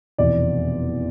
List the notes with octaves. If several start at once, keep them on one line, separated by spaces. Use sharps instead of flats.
F1 E2 B2 D5